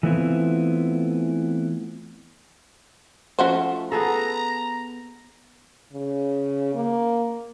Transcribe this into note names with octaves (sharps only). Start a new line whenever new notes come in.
E3 A3 B3 C4 E4 F4
F3 A3 C#4 F#4 C5
B3 G#4 A4 A#5
C#3
A#3